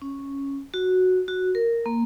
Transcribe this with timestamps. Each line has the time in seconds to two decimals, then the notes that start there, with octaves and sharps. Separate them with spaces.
0.02 C#4
0.74 F#4
1.28 F#4
1.55 A#4
1.86 A#3